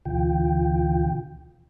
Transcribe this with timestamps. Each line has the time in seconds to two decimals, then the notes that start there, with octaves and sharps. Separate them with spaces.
0.05 D2 B2 D3 E3 F4 G5